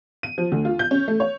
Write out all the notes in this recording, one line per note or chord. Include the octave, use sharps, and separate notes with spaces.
D#7
F3
D2
F4
G6
C#4
A3
C#5